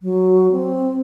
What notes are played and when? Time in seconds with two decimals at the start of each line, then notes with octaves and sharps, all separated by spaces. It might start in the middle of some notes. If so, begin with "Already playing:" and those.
0.01 F#3
0.51 C4